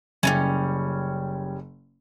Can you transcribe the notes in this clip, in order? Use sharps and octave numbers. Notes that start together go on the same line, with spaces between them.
F#1 G3 B3 C#4